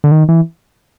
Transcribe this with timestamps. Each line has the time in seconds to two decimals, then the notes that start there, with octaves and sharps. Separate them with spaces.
0.04 D3
0.12 D#3
0.29 E3